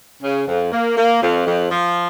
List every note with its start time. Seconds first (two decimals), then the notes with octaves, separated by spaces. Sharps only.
0.22 C#3
0.47 F2
0.72 A#3
0.97 A#3
1.22 F2
1.46 F2
1.71 F3